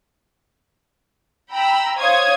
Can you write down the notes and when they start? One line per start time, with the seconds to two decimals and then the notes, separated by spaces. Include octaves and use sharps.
1.51 G5 A#5 B5 E6
1.98 C5 C#5 F5 D#6 G#6